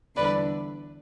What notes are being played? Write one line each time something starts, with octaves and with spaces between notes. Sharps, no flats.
E2 D3 G3 D4 B4 D5